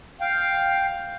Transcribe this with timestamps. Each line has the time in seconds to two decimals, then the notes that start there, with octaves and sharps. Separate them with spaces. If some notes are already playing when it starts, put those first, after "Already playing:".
0.21 F5 G5